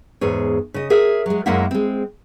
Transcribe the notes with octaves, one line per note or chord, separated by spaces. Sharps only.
E2 G#2 G#4 C#5
C#3 D#5
G#4 A#4 C#5 E5
F#3 G#3
F#2 G#3 A#3 E4 E5 F#5
G#3 C4